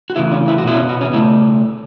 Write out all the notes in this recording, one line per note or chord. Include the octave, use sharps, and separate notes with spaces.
F#4
C#3 E3 A3 E4
C#4
E4
F#4
B2 B3 E4
C#4
F#4
C#4
C#3 A3 E4